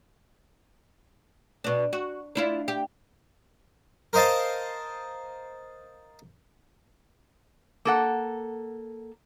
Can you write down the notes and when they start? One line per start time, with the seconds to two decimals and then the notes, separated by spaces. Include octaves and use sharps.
1.64 B2 D4
1.93 F#4
2.35 D4 E4 F4
2.68 G4
4.13 A#4 C5 D#5 F5 A5
7.85 A#3 A4 F#5